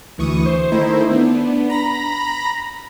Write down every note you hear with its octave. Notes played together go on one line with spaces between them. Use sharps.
D2 E3 C#6 D#6
C5
D#3 A3 D#4 E4 C5
B3 D4
A#5 B5 A#6